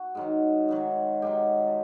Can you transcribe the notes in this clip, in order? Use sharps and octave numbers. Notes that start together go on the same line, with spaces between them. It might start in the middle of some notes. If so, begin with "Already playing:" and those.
Already playing: F#4
G#2 D#3 F#3
G#2 D#3 F#3
G#2 D#3 F#3 G4
A4